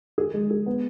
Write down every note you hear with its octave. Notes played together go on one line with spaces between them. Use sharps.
G#4
G#3
G#4
B3